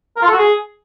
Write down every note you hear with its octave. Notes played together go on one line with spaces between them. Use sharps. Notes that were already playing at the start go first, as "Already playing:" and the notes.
A#4
F4
A4
F#4
G#4